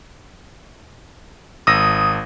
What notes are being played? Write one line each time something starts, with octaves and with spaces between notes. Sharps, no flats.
G#1 D#6 E6 A#6